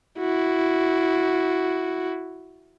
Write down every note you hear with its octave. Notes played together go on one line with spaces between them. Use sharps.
E4 F#4